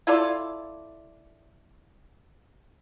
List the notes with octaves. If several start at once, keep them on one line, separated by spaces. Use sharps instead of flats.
E4 F4 A4 D5